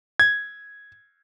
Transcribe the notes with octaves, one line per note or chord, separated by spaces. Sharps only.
G#6